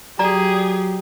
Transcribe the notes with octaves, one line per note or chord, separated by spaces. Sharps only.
F#3 G4 G#4 D5 A#5